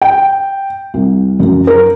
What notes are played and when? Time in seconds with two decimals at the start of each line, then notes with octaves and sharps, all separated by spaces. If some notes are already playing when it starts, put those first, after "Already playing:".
0.02 G5
0.94 C2
1.40 F#2
1.67 A#4